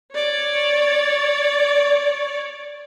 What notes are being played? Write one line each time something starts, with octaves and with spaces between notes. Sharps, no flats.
C#5 D5